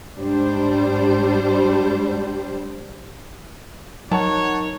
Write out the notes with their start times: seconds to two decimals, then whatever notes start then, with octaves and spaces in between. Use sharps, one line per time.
0.18 G#2 G3 D4 C5
4.11 F#3 D#4 A#4 C#5 F#5 A5 C#6